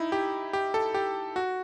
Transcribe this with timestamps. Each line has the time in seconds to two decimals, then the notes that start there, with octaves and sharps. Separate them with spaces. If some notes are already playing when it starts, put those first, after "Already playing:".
Already playing: D#4 E4
0.12 G4
0.53 G4
0.74 A4
0.94 G4
1.36 F#4